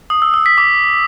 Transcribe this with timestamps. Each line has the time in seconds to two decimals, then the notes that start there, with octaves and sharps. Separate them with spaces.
0.10 D#6
0.22 E6
0.34 E6
0.46 B6
0.58 D6